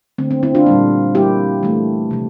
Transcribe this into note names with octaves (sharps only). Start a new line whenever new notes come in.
D3 A3 C4
C4
C4 E4
D4 F4
A#2 G3 A#3
E3 G3 A#3 E4 G4
E3 A3
C3 F3